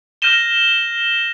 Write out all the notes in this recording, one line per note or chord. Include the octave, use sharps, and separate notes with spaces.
F6 G6 A#6 D#7 E7 G7